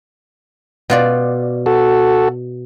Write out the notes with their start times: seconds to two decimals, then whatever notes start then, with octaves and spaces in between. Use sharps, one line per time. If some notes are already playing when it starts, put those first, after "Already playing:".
0.90 B2 F4 D5
1.66 F#4 A4